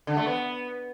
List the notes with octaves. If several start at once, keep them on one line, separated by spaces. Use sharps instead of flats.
D3
A3
B3